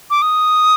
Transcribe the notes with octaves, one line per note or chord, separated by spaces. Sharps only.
D6
D#6